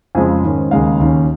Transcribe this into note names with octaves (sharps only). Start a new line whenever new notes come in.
F2 C#3 F3 G#3 G#5
G#2 D#3 C#4
D#2 C#3 G#3 D#4 F5
D#2 D#3 C#4